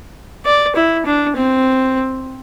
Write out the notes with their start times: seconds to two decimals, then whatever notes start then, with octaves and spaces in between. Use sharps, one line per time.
0.46 D5
0.76 E4
1.06 D4
1.36 C4